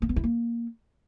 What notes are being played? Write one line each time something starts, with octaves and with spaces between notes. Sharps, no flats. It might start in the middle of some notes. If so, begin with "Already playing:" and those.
A#3
B3
E4
A#3